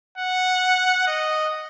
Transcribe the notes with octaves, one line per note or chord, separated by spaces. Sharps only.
F#5
D#5